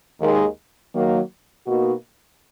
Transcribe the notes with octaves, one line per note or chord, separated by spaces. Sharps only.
D#2 D#3 G#3
D#3 F#3 A#3
B2 A#3 D#4 F#4